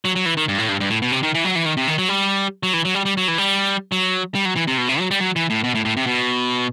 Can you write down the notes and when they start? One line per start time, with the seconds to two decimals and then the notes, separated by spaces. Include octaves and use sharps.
0.05 F#3
0.16 F#3
0.26 E3
0.37 D#3
0.48 G2
0.58 A2
0.69 G2
0.80 G2
0.90 A2
1.02 B2
1.12 C3
1.23 D#3
1.34 E3
1.45 F#3
1.55 E3
1.65 D#3
1.77 C3
1.87 D#3
1.98 F#3
2.09 G3
2.63 F#3
2.74 E3
2.85 F#3
2.95 G3
3.05 G3
3.17 F#3
3.28 E3
3.38 G3
3.92 F#3
4.35 G3
4.45 F#3
4.56 E3
4.67 C3
4.78 B2
4.89 C3
4.99 F#3
5.11 G3
5.20 F#3
5.36 E3
5.50 A2
5.64 B2
5.75 A2
5.85 A2
5.97 C3
6.06 B2